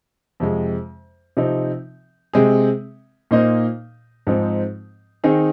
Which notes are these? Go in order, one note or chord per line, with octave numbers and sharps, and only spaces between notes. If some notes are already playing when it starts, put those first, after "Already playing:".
F2 C3 G#3
C3 F3 C4 D#4
C3 G#3 C4 G#4
A#2 A#3 D#4 C5 D#5
G#2 F3 G#3 C4 D#4
D#3 C4 D#4 G#4